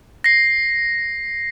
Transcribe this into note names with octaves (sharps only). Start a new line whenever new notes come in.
A#6 C7